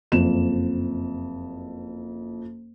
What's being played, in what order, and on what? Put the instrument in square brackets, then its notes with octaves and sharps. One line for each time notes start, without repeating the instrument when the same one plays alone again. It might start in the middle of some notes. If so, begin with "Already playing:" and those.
[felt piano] F#1 F2 E7